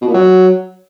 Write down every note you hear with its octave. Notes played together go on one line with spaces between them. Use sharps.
B2
A#2
F#3